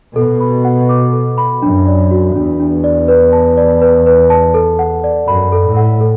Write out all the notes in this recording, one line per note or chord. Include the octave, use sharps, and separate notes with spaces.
B2 A4
B5
F#5
D6
A4
B5
F#2 D4
D5
F#4
E2 D4
D4
D5
B4
A5
D5
B4
B4
A5
A4
F#5
D5
F#2 B5
A4
A2
F#5
A4